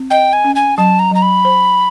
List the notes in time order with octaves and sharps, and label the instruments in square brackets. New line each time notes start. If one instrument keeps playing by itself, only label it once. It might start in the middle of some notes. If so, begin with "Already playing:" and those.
Already playing: [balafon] C4
[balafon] D#5 [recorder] G5
[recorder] G#5
[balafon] C#4
[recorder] G#5
[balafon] F#3 [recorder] A5
[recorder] A#5
[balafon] F#3 [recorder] A#5
[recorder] B5
[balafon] C5